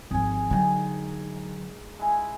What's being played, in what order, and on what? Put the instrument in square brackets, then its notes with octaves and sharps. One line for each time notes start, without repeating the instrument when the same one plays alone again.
[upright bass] G#1 F3 [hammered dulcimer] G#4 G#5
[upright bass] D3 F#3 [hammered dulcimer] D#3 G#3
[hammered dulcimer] G#3 E4